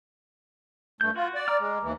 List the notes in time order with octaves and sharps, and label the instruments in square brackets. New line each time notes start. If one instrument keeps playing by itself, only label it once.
[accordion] G2 A3 [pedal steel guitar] G6
[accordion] F4 [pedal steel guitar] F#4
[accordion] D5
[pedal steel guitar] A#5 D6 F6
[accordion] G#3
D#2 E3